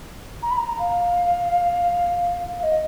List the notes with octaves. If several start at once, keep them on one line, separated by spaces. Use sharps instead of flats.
A#5
B5
A#5
F5
F5
D#5